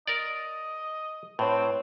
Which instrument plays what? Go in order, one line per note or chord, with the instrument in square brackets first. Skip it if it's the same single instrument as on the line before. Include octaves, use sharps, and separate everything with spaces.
[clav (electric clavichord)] A#4 D5 [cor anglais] D#5
[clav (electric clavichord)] A2 [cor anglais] C4 [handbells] B4 C#5